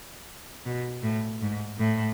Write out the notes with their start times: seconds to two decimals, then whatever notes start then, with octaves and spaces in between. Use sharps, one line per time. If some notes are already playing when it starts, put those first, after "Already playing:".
0.66 B2
1.03 A2
1.42 G#2
1.79 A2